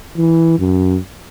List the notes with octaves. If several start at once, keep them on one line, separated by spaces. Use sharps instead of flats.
E3
F#2